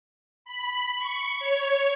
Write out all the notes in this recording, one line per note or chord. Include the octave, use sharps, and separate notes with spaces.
B5
C#6
C#5